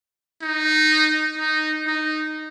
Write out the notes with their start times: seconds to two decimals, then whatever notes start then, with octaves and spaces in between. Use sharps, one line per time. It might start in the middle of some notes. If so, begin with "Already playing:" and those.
0.42 D#4
1.38 D#4
1.86 D#4